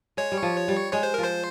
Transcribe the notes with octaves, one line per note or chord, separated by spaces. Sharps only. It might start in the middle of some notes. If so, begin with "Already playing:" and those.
G#3 C#5
G3
F3
G3
G#3 C#5
C5
F3 A#4
C5